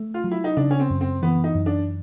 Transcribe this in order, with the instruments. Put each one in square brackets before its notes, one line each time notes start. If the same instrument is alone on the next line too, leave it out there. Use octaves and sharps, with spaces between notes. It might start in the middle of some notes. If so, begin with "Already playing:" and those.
Already playing: [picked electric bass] A3
[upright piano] F4
[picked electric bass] F#3
[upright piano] E4
D#4
[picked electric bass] C#3 [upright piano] D4
[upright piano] C#4
C4
[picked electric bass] F#2
[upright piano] C4
[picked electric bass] E3 [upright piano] B3
[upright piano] D#4
[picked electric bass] F#2
[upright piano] D4